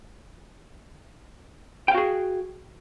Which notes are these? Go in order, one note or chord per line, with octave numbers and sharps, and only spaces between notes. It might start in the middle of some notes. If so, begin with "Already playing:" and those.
F#4 G#4 F5 G5